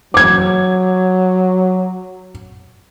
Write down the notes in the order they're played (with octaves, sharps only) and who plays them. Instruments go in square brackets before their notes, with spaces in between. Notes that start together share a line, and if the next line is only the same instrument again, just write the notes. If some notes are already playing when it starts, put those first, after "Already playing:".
[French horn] F#3 [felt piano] D6 G#6